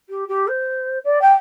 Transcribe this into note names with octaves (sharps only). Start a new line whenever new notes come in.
G4
G4
C5
D5
G5